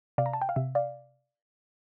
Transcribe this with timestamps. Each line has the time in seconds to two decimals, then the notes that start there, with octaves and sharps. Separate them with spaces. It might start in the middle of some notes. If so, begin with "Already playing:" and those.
0.18 C3 D5 F5
0.26 A#5
0.33 A5
0.42 G5
0.49 F5
0.56 C3 E5
0.75 D5 F5